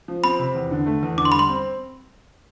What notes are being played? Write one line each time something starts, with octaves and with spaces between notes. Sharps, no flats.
F3
C4 B5
C3
E2
D3
A3
E2
D3 D6
C6
G3 B5
C6
C4